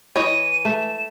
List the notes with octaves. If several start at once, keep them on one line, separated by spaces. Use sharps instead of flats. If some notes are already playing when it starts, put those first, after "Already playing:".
E3 C#5 D#5 D#7
A3 E7